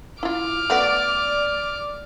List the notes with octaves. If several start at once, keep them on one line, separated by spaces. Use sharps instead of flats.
E4 F4 D6 F6
A3 B3 F#4 D5